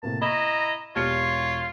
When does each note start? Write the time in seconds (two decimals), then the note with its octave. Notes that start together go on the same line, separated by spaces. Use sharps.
0.03 A2 C3 A#3 A5
0.21 E4 D#5 A#5 B5 C#6
0.96 E1 F4 G4 C#5 C#7